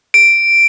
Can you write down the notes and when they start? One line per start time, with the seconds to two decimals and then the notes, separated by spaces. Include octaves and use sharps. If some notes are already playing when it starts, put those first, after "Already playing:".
0.14 D7